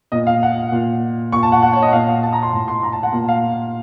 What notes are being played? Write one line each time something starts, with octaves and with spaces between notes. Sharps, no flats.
A#2 D#5
F5
F#5
A#2
A#2 C#6
A5
F#5
F#5
C#5
D#5
A#2 F5
F5
A5
A#5
C6
A2
C6
A#5
A5
F#5
A#2
F5